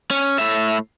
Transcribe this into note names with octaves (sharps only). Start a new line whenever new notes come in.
C#4
A2 E5